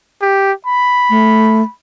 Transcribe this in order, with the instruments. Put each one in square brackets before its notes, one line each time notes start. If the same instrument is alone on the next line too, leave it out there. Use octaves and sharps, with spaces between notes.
[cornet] G4
B5
[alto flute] A3